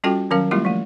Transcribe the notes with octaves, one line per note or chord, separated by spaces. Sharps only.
G3 C#4 F4 F#4 A4 G5
D#3 F#3 C#4 A#4 F5
G3 G#3 A#3 E4 F4 G4
F3 A3